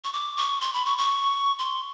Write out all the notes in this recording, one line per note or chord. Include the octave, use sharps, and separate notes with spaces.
C#6
D6
C#6
C6
B5
C#6
C#6
C6